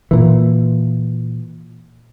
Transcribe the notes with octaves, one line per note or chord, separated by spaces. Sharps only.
A#2 E3